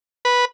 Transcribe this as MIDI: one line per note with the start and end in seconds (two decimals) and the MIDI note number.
0.25 0.45 71